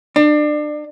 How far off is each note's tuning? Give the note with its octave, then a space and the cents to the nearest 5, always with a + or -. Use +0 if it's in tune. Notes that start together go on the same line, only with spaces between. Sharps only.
D4 +30